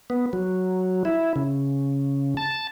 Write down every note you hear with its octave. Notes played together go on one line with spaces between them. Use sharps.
B3
F#3
E4
C#3
A5